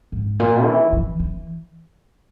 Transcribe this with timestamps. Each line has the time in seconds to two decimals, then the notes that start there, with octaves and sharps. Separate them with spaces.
0.12 G#2
0.40 A#2
0.66 E3
0.93 E3
1.19 E3